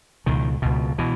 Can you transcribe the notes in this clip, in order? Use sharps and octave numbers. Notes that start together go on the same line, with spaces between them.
C#2 B2 D#3
C#2 B2
B2 E3